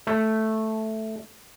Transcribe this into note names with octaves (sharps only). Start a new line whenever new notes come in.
A3